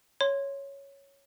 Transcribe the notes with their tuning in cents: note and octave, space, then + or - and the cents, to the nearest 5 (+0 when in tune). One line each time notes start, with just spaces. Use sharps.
C#5 +0 C6 +0